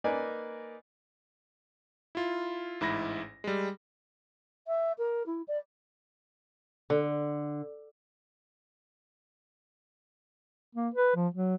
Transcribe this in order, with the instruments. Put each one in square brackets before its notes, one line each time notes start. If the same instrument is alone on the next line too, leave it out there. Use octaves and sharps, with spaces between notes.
[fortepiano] A#3 D#4 B4 D5 G#5
[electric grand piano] E4 F4
A1 G#2 E4 B5 A#6
G3 G#3
[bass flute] E5
A#4
E4
D5
[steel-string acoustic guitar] D3
[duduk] A#3
B4
F3
F#3